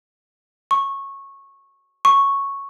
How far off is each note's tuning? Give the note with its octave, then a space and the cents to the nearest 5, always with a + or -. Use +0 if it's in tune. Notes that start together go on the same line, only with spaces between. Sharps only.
C#6 -15
C#6 -5